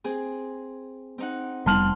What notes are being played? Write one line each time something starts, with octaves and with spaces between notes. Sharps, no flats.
C4 G#4
C4 D#4 F#5
F1 G3 B3 A5 C6 F6 F#7